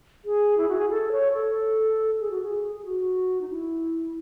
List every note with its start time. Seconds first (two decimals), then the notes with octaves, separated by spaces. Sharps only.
0.25 G#4
0.58 E4
0.68 F#4
0.78 G#4
0.90 A4
1.12 C#5
1.33 A4
2.20 G#4
2.31 F#4
2.42 G#4
2.75 G#4
2.86 F#4
3.41 D#4
3.50 E4